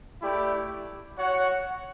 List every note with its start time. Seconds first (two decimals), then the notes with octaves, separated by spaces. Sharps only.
0.21 A3 E4 G4 D5
1.17 F#4 C#5 F#5